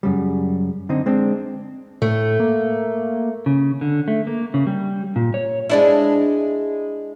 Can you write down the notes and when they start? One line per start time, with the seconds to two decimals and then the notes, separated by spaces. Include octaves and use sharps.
0.03 F#2 C#3 G3
0.89 D3 C4 D#4
1.06 G#3 C4 D4
2.02 A2 A3
2.40 A#3
3.46 C#3
3.81 D3
4.08 A3
4.27 A#3
4.54 C#3
4.67 G3
5.16 A#2
5.34 C#5
5.70 G#3 D4 E4